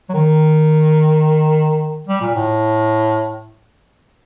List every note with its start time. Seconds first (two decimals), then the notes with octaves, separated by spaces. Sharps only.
0.09 F#3
0.14 D#3
2.07 G3
2.22 A#2
2.36 A2